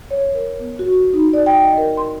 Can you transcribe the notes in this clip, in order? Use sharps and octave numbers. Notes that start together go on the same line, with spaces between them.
C#5
A#4
B3
F#4
D#4
D5
G5
D#5
A#4
C6